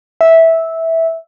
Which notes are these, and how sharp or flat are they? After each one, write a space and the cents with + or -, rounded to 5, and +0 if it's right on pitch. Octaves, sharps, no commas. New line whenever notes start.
E5 -10